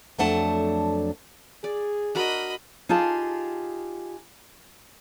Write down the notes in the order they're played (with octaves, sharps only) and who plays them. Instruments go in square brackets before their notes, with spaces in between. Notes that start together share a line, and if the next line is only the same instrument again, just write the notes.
[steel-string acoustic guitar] F2 F#3 A3 D4 F#5 A5
[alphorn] G#4 [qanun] D5
[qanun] D4 F#4 A#4 [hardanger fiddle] D#5 B5
[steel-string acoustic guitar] D#4 F4 G4 G#4 A5